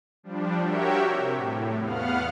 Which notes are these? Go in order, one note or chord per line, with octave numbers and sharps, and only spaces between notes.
F3 G3 D4
F#4 G4 A#4 C#5 E5 G5
C3
A2
E2 B3 F5 F#5 F6